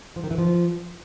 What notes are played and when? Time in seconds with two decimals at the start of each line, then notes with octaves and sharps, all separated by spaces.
0.16 F3
0.24 D#3
0.31 E3
0.38 F3